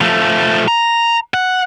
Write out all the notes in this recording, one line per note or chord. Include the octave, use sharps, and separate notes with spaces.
F3 A3
A#5
F#5